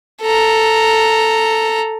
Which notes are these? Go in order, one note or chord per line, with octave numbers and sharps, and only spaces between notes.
A4 A#5